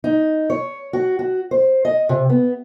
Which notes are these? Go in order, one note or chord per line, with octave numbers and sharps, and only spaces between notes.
D#4
C#5
F#4
F#4
C5
D#5
C3
B3